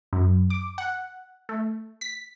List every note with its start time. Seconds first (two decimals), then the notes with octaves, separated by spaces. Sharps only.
0.13 F#2
0.50 D6
0.78 F#5
1.49 A3
2.01 B6